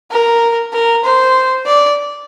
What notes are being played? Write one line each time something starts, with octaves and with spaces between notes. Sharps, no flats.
A#4
A#4
C5
D5